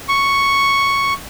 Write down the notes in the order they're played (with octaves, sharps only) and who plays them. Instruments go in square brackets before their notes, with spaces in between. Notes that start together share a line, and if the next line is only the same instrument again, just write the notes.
[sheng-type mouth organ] C#6